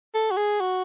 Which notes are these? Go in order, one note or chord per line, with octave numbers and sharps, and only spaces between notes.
A4
F#4
G#4
F#4